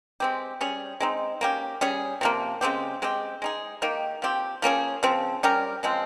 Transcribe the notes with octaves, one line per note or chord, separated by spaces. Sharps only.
G#3 C4 G4
G3 C#4 G#4
G#3 C4 D#4
A#3 C#4 G4
G3 C#4 G#4
C3 F3 A#3
C#3 G#3 C4 G4
G#3 C4 G4
G#3 D#4 G#4
D#3 A#3 D#4 G4
F3 C4 G4
F3 A#3 C#4 G#4
C#3 F3 C4
G3 C#4 G4 A#4
C#3 F3 G#3 C4